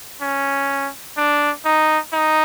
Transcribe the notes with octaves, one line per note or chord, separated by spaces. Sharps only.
C#4
D4
D#4
D#4